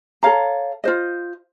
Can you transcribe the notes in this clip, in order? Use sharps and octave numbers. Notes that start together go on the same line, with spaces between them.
A4 C#5 F5 A#5
F4 C5 D#5